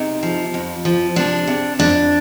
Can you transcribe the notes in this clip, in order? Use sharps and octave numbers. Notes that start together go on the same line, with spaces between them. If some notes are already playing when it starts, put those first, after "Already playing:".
Already playing: C3 D#4
F3
F2
F3
C3 D4
C3
F2 D4